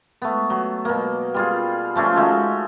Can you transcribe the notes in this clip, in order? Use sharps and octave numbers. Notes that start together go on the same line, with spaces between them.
A3 B3
F#3
B2 A#3
G3 F4 G#4
F3 A3 C#4 D4
G#3 A3 D#4 F#4